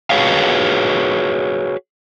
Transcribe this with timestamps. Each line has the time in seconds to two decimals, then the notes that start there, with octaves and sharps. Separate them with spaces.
0.10 F#4 G#4 B4 C#5 F5